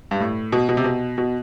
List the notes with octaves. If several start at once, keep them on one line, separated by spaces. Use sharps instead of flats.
G2
A2
B2
B2
C3
B2
B2